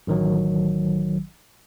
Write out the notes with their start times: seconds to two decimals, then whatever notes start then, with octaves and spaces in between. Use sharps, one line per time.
0.07 A1 D#3 F#3